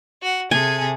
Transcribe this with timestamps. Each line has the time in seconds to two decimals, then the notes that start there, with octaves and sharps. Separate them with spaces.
0.22 F#4 F#5
0.51 C3 G#4 A4 G#5